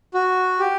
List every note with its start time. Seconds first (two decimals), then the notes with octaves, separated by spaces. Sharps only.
0.14 F#4
0.59 G4